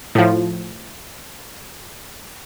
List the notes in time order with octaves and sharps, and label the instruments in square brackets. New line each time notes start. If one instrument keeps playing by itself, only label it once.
[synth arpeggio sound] A2 F3